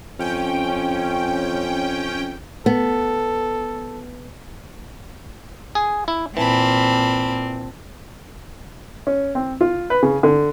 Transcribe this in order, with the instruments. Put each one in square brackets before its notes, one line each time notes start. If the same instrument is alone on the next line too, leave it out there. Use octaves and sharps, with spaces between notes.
[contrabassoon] F2 [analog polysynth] C#4 G5
[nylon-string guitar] B3 [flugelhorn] A4
[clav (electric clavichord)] G#4
E4
[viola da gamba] A#2 C4 [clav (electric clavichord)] E3 [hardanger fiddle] A5 B5
[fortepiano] C#4
C4
F4
B4
C#3
D3